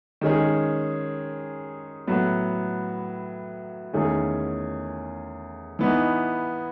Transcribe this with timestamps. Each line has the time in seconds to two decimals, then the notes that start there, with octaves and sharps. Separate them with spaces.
0.21 D#3 G#3 C#4 G#4
2.07 A2 F#3 B3
3.93 E2 D#3 A3 C#4 G#4
5.79 E3 B3 D#4